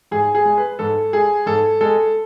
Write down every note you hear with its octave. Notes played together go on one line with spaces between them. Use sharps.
G#2 G#4
G#4
G#3
B4
G#2 A4
G#3 G#4
G#2 A4
G#3 A4